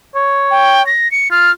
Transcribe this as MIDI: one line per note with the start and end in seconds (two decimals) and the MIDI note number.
0.15 0.90 73
0.51 0.85 79
0.86 1.10 94
1.11 1.31 97
1.31 1.49 65
1.31 1.51 89